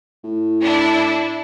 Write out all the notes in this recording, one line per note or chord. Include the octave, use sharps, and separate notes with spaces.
A2
D4 E4